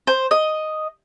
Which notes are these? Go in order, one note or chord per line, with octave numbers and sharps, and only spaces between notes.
C5
D#5